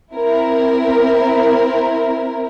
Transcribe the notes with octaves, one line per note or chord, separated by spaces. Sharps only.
C4 E4 A#4